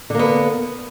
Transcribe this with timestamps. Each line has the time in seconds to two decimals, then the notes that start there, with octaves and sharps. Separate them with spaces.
0.10 D3
0.15 A#3
0.19 B3